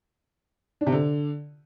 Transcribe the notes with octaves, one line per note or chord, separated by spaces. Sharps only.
D4
C3
D3